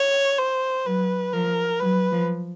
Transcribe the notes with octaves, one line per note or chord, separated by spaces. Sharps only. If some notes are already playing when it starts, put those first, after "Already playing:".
Already playing: C#5
C5
F#3 B4
F3 A#4
F#3 B4
F3